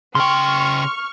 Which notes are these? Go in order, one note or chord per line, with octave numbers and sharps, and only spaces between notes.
C#3 G5 C6 C#6 F6